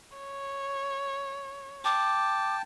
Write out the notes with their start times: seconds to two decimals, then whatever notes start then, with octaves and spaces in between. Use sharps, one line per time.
0.17 C#5
1.85 G5 A5 D6